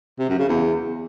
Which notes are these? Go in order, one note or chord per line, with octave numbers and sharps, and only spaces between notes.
C3
F#2
C#3
E2